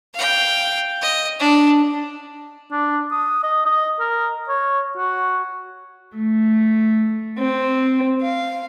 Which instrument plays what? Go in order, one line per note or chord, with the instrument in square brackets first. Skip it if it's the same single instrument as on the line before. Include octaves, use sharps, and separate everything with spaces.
[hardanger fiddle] F5 G5
D#5
D4
[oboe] D4
D#6
D#5
D#5
A#4
C#5
F#4
[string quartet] A3
C4
F5